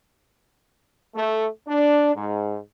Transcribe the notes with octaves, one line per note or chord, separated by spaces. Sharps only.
A3
D4
G#2